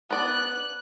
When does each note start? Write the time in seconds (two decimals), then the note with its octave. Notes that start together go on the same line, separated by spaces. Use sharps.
0.11 B3 D5 F#6